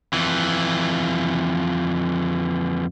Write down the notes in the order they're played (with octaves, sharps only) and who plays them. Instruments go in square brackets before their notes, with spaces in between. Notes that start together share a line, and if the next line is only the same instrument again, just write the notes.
[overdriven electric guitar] F2 E3